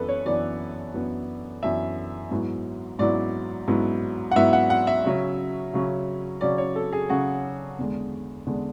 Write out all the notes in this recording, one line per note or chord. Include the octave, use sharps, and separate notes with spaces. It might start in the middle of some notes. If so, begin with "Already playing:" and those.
Already playing: F#2 E3 B3 D4 A4 B4
C#5
F#2 E3 B3 D4 D5
F#2 E3 B3 D4
F#2 E3 B3 D4 E5
G#2 F#3 B3 E4
G#2 F#3 B3 E4 D5
G#2 F#3 B3 E4
F#5
G#2 F#3 B3 E4 E5
F#5
F#5
E5
C#3 F#3 C#4
C#3 F#3 C#4
C#3 F#3 C#4 D5
C#5
A4
G#4
C#3 F#3 C#4 F#4
E2 D3 G#3
E2 D3 G#3